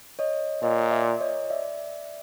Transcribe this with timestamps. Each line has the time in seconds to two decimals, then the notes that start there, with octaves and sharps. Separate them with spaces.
0.19 C#5 D#5
0.62 A#2 C#5 D#5
0.91 D5 E5
1.21 C#5 D#5
1.50 D5 E5